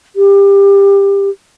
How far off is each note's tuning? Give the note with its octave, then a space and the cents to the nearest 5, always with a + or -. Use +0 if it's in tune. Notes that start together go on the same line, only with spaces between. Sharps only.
G4 +20